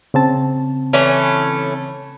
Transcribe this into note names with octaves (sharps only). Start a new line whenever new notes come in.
C#3 C4 A5
E3 A3 C#4